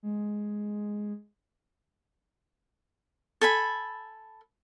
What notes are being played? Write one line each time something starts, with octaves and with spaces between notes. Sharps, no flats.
G#3
A4 G#5 B5